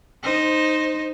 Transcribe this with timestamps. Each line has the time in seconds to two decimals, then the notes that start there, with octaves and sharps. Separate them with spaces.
0.23 D#4 C5